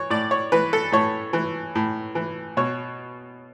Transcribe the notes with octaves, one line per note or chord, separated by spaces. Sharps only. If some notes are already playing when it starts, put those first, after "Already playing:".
Already playing: E3 C#5
A2 D5
C#5
E3 B4
A4
A2 C#5
E3
A2
E3
B2 C#5